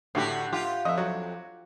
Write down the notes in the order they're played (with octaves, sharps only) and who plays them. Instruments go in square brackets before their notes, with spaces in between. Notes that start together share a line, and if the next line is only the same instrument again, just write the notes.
[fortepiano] A2 [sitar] D3 F#4 G4
[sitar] F4 G4
[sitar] F2 [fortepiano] D#5 E5
[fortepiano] F#3